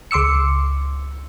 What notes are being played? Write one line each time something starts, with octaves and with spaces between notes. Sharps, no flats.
C#2 C6 D6 E6 C#7